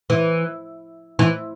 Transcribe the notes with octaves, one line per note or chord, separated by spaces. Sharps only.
E3
E3